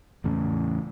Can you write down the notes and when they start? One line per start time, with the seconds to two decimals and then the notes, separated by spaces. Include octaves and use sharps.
0.24 E2 A2 C#3